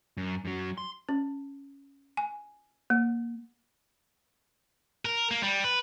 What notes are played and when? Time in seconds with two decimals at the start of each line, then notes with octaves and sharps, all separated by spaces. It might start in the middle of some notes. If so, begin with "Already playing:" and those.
0.17 F#2
0.45 F#2 F#3
0.78 C6
1.09 C#4
2.17 G#5
2.90 A#3
5.05 A#4
5.31 A#3
5.43 G3
5.64 B4